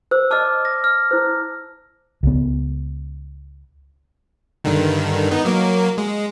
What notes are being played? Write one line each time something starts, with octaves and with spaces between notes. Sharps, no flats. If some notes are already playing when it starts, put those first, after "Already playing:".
C5 E6
D5 D#5 A5 D6 F6
A#6
F6
E4 C5
C#2 B3
G2 D3 D#3
B3 D#4
F#3 A#3
G#3